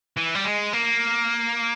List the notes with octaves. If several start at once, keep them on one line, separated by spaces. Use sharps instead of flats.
E3
G3
G#3
A#3